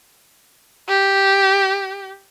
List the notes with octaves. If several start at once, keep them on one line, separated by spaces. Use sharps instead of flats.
G4